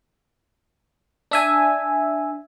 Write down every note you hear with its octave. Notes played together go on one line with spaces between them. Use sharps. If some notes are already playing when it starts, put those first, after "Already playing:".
D4 E5 G#5